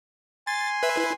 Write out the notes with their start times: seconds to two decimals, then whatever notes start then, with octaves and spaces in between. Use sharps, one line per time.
0.47 G#5 C6 A6
0.83 B4 E5
0.97 E4 B4